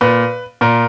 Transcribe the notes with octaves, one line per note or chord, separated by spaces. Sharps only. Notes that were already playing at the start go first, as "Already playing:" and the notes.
A#2 B4
A#2 A#4